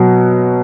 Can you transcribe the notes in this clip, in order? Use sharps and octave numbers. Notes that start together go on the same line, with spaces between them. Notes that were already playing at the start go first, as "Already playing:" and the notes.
Already playing: B2 F#3